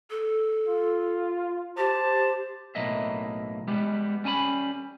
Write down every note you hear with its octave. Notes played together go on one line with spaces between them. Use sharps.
A4
F4
G4 C5 A5
B1 A2 A#3 D#5 E5
G3 G#3 B3 G4
G3 C#4 G#5 A5 B5